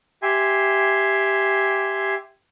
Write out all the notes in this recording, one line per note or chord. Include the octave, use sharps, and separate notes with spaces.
G4 E5 G#5 C6